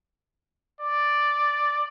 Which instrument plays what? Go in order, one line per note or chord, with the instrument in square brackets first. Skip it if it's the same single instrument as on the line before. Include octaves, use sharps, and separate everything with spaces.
[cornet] D5